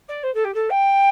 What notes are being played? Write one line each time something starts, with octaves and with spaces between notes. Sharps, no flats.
D5
C5
A4
G4
A4
G5